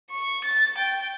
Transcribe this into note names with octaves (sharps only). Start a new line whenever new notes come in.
C#6
A6
G5